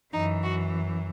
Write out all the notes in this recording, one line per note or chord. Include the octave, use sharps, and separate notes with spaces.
F#2 E3 D#4
F#4